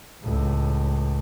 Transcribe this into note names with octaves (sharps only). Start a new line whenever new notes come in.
C#2 A2